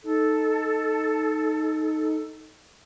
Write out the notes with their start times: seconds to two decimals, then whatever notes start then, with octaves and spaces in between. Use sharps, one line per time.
0.04 D#4 A4